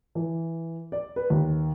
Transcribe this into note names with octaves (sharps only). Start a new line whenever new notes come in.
E3
D5
B4
D#2